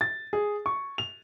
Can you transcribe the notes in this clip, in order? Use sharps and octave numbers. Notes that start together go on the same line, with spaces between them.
A6
G#4
C#6
F7